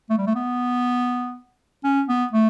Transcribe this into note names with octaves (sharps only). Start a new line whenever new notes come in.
A3
G3
A3
B3
C#4
B3
A3